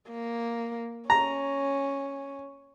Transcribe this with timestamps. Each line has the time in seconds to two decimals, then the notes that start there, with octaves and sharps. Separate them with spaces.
0.11 A#3
1.10 C#4 A#5